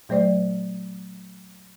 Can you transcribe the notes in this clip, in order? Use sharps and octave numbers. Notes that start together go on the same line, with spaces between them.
A#2 F#3 A3 C5 D5